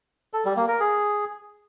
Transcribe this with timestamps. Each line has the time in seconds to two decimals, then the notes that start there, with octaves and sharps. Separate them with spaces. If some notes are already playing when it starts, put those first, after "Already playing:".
0.33 A4
0.45 G3
0.57 A#3
0.68 A#4
0.80 G#4